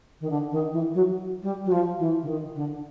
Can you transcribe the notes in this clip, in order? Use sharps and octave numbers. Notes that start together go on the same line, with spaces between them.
D#3
D3
D#3
E3
F#3
G3
F#3
F3
E3
D3
D#3
D3